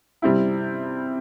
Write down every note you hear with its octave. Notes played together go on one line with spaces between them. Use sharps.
C3 G3 C4 E4